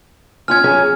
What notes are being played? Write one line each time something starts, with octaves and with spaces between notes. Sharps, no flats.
C#4 F4 G#5 F6 G#6
F#3 C#4 G#4